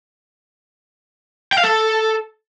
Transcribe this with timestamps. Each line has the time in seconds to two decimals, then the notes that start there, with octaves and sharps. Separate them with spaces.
1.53 G5
1.58 F5
1.64 A4